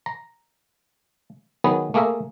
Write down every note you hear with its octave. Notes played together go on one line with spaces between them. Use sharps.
A#5
D#3 F#3 B3 G#4 B4
A3 A#3 G#4 A#4 E5